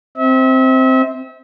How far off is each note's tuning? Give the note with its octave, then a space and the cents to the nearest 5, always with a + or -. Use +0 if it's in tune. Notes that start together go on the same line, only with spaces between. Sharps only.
C4 +0 E5 -35